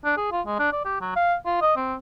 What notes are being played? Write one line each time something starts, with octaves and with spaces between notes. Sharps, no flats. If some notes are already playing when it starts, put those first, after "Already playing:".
D4
G#4
F4
G#3
D4
D5
G4
F#3
F5
F4
D#5
C4